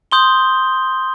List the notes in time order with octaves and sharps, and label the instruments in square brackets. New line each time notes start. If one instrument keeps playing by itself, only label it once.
[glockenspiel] C6 D#6 G6 G7